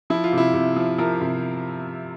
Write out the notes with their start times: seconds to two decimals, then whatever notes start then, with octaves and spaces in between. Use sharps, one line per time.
0.10 F3 E4
0.24 F4
0.32 C3
0.38 E4
0.54 C3
0.76 F3
0.98 F3 A#4
1.21 C3